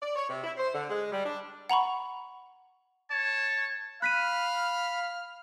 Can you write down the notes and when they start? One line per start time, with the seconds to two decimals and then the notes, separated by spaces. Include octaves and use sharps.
0.01 D5
0.15 C#5
0.28 C3
0.44 E4
0.56 C5
0.73 D3
0.89 G#3
1.12 G3
1.25 D4
1.70 F#5 A#5 B5 C#6
3.10 C#5 A5
4.02 F5 B5 F6 F#6 B6 D#7